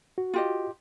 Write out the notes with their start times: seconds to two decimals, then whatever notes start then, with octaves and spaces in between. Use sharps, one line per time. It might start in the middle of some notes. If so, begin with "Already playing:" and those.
0.18 F#4
0.34 F4 G4 D#5